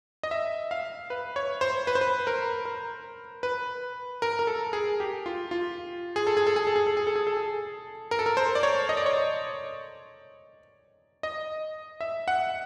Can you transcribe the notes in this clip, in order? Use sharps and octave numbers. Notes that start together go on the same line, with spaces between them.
D#5
E5
F5
B4
C#5
C5
B4
C5
B4
A#4
A#4
B4
A#4
A#4
A4
G#4
G4
F4
F4
G#4
A4
G#4
A4
G#4
A4
G#4
A4
G#4
A4
G#4
A4
G#4
A#4
A4
A#4
C5
D5
C#5
D#5
D5
C#5
D5
D#5
E5
F#5